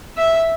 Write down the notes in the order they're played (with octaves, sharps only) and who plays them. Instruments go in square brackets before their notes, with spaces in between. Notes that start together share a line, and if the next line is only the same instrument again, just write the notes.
[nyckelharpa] E5